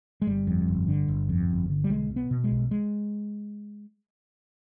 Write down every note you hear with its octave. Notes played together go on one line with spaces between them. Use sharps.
G#3
G1 G3
F2
G1
D3
G1
F2
G1
D3
G3
B1 G#3
B2
B3
B2
G#3
B1
G#3